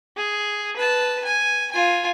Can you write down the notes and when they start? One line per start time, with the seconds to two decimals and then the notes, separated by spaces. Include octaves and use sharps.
0.17 G#4
0.76 B4 A5
1.25 G#5
1.72 F4 G#5